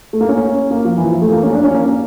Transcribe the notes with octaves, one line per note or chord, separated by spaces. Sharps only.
A3
A#3
C#4
A#3
F3
E3
F3
A3
A#3
C#4
D4
C#4
A#3
C#4